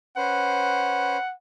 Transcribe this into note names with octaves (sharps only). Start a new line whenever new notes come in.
C#4 B4 C5 F#5